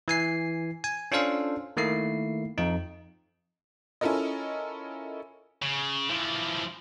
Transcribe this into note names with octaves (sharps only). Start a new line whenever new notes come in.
E3 G#5 C7
G#5
C#4 D4 F4 A4 C5 F5
D#3 A3 A#3 E4 C7
F2 D#4
C#4 E4 F4 A4 A#4 D#5
C#3
E3 F3